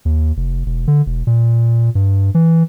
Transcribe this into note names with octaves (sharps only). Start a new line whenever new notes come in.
D#2
F1
E1
D3
E1
A#2
G2
E3